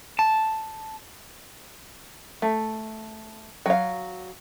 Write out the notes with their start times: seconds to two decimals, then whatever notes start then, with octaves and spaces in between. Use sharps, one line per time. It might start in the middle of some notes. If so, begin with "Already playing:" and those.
0.19 A5
2.42 A3
3.66 F#3 F5